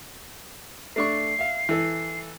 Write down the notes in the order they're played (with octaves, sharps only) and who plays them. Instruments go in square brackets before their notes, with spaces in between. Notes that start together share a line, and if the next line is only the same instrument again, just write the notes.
[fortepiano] A3 D4 C#6 [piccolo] C7
[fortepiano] E5 F5
E3 A4